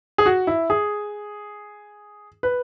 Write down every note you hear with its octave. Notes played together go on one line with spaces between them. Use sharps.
G#4
F#4
E4
G#4
B4